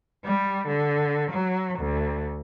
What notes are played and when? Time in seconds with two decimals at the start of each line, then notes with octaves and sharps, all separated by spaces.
0.24 G3
0.67 D3
1.32 F#3
1.78 D2